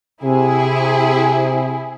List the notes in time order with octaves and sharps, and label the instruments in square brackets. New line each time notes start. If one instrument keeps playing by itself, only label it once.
[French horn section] C3 [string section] E4 G#4